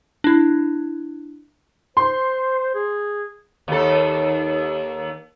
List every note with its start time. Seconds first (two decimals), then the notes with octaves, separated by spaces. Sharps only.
0.24 D4 E4
1.97 C5 C6
2.75 G#4
3.68 D#2 A4